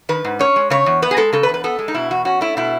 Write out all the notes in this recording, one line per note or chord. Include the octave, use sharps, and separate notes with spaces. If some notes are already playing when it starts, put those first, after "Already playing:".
D#3 B4
G#2
C#4 C#5
G#3
C#3 C#5
E2
B3 B4
G#4
G#3 A4
C#3 A4
B4
E2
B4
B3 A4
G#3
D#4
B2 E4
E2 F#4
C#4 F#4
A3 E4
B2 E4